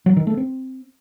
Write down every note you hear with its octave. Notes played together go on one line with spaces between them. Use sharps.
F#3
D#3
A3
C4